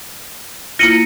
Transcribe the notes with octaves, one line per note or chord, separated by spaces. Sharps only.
A#3 E4 F4 A#6 C#7 D#7